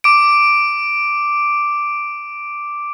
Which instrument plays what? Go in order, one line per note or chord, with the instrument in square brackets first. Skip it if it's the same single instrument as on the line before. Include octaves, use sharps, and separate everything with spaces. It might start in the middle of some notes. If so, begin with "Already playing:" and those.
[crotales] D6 D7